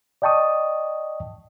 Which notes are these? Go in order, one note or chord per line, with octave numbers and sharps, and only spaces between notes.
D5 D#5 G5 A5 C#6 D#6